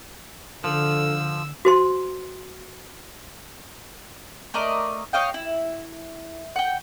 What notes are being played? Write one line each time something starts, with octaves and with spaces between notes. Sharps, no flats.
D3 F3 D4 A4 E6
F#4 C5 C6
A3 A#4 D5 D#5
C#5 D#5 F5 G5
E4
F#5 G5